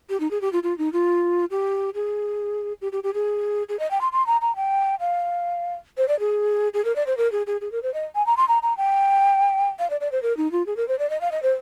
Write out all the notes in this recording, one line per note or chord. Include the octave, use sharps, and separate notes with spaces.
G4
D#4
G#4
G4
F4
F4
D#4
F4
G4
G#4
G4
G4
G4
G#4
G#4
D#5
G5
C6
C6
A#5
A#5
G5
F5
C5
D5
G#4
G#4
A#4
D5
C5
A#4
G#4
G#4
G#4
A#4
C5
D#5
G#5
A#5
C6
A#5
A#5
G5
F5
D5
D5
C5
A#4
D#4
F4
G#4
A#4
C5
D5
D#5
F5
D#5
C5